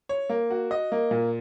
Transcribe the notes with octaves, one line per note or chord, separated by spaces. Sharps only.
C#5
A#3
F#4
D#5
A#3
A#2